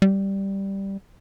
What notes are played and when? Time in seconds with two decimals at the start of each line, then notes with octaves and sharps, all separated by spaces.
0.02 G3